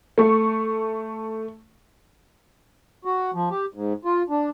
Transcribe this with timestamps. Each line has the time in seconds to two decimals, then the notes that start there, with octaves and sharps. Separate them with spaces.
0.18 A3 C#6
3.05 F#4
3.34 F3
3.51 G4
3.74 G#2
4.05 F4
4.30 D4